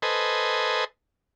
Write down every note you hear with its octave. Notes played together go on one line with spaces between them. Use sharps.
A4 B4 C5 D#5 G#5